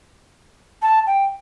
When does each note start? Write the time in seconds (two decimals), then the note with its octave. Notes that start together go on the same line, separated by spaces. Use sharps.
0.82 A5
1.07 G5